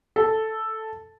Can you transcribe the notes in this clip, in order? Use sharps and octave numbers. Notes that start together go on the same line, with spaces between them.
A4